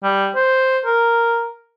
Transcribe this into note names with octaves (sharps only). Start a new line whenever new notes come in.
G3
C5
A#4